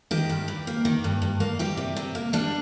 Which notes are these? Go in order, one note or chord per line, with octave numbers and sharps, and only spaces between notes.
D#3 G4
G2
G2
A#3
D#3
G2
G2
A#3
G3 G4
C3
C3
A#3
G3 D4